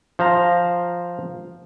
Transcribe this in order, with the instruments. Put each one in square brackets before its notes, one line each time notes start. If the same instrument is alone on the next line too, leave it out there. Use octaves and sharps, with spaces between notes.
[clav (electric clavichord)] F3 C5 F5 A#5